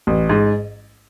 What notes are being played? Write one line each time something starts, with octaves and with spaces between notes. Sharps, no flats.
A1
G#2